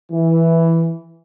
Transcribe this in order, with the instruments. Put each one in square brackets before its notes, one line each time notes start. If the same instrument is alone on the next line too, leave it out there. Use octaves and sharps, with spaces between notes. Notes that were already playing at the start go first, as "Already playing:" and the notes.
[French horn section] E3